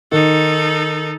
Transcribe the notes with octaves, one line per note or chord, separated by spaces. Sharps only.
D#3 D#4 A4